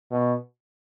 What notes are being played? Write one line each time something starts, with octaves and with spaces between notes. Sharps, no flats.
B2